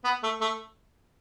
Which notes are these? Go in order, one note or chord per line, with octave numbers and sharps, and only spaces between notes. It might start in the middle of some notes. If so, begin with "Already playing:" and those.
B3
A3
A3